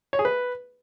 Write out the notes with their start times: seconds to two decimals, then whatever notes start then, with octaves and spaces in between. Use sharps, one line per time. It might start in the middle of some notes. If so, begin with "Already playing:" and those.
0.13 C#5
0.19 G#4
0.25 B4